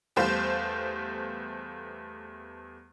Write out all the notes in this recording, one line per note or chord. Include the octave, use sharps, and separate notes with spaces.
E2 G3 A3 C5 F5